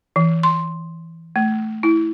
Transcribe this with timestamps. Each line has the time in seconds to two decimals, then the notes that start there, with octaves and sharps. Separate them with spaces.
0.16 E3
0.43 C6
1.36 A3
1.83 E4